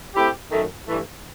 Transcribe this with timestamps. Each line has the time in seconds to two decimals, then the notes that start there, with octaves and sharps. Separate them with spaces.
0.16 A3 C4 E4 G4
0.51 F#2 D#3 A3
0.87 G2 E3 A3